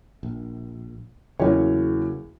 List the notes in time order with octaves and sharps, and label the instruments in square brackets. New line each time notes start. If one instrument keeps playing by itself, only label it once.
[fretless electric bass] A#1
[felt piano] E2 C#4 C#5 [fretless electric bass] C#3 F#3 A#3